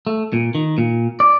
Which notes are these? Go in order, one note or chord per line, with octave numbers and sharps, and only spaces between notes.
A3
A#2
D#3
A#2
D5